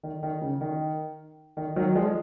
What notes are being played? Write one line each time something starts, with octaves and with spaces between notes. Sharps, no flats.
D#3
D#3
C#3
D#3
D#3
D#3 F#3
F3 G#3